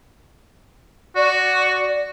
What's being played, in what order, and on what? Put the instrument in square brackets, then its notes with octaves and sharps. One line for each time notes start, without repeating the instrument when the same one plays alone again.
[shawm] F#4 [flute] D5